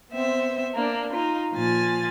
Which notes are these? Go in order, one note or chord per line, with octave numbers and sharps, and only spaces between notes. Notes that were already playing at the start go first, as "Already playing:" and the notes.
B3 C4 C5 E5
A#3 D4
D#4 F4
A#2 F3 G#5 A6